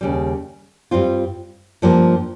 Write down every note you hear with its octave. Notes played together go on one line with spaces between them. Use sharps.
D#2 C#3 G3
G2 G3 C4 F4
G2 F3 A#3